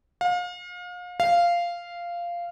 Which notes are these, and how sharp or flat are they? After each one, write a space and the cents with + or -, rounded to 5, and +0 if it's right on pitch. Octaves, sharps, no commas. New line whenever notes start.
F5 +35
F5 -10